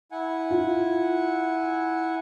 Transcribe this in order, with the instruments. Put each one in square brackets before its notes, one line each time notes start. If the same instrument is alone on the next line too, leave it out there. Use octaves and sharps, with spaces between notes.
[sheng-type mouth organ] E4 F#5 G#5
[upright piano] F4